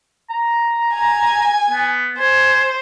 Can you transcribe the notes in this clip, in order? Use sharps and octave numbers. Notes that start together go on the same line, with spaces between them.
A#5
G#5
B3
C5 G#5